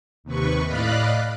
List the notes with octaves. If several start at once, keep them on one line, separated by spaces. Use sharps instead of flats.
D#2 C3 B4 C#6
A2 D5 D#5 F5 B5 F#6